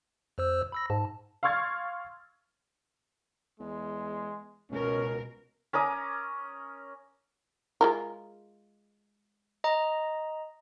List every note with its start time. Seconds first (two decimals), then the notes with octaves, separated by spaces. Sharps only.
0.38 F2 C5 E6
0.72 B5 E6 A#6
0.90 G#2 A5
1.43 F5 C6 C#6 F6 G#6 A6
3.60 E2 G#3
4.71 C#2 B2 C#4 A#4
5.73 C#4 A#4 D6 D#6
7.81 G#3 F4 A#4
9.64 D#5 A#5